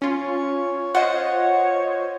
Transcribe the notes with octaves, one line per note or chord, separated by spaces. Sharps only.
C#4 F4 C#5
F4 C5 D#5 F#5